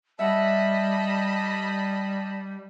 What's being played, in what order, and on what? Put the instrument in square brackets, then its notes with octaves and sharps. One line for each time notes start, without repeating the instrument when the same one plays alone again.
[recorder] G3 [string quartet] D#5 B5 [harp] E5 F#5 [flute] A5